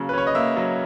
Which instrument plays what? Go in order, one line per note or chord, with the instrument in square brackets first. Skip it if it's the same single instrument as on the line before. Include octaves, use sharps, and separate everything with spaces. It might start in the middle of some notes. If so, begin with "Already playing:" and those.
Already playing: [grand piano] C#3 F#3 A#3
B4
C#4 C#5
D#5
A#3 E5
F#3